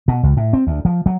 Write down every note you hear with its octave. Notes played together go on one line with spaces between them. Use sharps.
B2
C#2
A2
C4
D2
F3
F#3